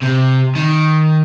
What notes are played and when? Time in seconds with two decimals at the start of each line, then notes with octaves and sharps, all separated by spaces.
0.03 C3
0.55 D#3